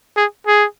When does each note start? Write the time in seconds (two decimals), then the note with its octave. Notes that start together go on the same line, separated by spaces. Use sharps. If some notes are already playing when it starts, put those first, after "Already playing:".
0.17 G#4
0.47 G#4